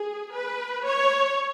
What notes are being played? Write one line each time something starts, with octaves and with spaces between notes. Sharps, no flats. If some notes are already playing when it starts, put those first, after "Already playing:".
Already playing: G#4
B4
C#5